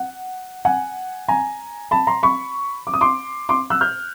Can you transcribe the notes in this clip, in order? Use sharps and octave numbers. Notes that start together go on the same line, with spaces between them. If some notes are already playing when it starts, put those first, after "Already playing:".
Already playing: F#5
F#5 G#5
G#5 A#5
A5 B5
A#5 C6
B5 C#6
D6
D#6
C6 D6
C6 D6
E6 F#6
F6 G6